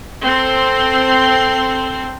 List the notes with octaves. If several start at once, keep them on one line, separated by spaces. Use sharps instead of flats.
C4 A4 C6